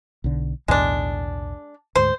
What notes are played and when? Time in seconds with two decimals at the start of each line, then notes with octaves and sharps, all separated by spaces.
0.24 B1 D3
0.68 B1 E2 A2 G#3 D4
1.96 D2 G#2 C5